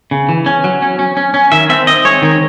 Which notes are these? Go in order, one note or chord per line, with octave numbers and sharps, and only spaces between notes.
C#3
E3
C#4
F#3
C#4
C#4
C#4
C#4
D#3 E5
C4 E5
C4 D#5
G#3 C#5
D#3